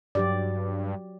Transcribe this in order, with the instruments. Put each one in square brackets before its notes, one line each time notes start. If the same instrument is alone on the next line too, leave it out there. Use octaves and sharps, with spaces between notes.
[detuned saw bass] G2 [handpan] F#3 G4 D5